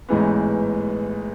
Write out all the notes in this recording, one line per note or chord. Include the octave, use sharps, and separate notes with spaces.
A1 G#2 E3 G#3 B3